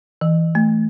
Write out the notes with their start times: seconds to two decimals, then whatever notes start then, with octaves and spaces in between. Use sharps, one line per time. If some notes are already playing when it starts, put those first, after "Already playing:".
0.21 E3
0.55 A3